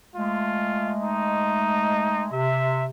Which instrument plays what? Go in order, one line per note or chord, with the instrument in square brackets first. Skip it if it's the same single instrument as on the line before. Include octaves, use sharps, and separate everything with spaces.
[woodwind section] G#3 A3 [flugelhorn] F4
[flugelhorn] D#4
[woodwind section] C3 [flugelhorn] E5